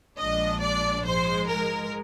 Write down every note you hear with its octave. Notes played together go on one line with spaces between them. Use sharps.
A#1 A#2 G#3 D4 D#5
D5
G#2 F3 G#3 C5
A#4